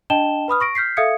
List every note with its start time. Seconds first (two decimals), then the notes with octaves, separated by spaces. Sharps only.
0.10 D4 D#5 G5 A5 E7 G7
0.48 B4 B5 D#6 F6
0.60 C#6 A#6 D7
0.75 F6 G6 B6 C7
0.97 A4 E5 F5 D#6 G#6 C#7